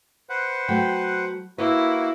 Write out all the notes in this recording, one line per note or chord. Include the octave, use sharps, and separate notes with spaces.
B4 C5 F#5
F#3 A3 G5
A#3 E4 F#4 B4